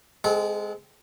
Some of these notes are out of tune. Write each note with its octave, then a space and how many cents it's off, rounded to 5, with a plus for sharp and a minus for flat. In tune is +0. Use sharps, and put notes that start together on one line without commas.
G#3 +0 C4 -25 A4 -35